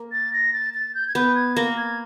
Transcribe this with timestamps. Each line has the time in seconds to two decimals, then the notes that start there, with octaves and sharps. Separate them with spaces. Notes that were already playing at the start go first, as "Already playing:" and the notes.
Already playing: A#3
0.12 A6
0.33 A#6
0.53 A6
0.74 A6
0.95 G6
1.08 G#6
1.15 B3 G6
1.35 G#6
1.56 A#3 A#6
1.77 G#6